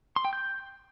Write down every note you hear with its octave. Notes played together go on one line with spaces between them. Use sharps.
C6
G5
G6